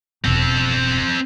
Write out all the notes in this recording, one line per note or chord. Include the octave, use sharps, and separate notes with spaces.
E1 C4 A4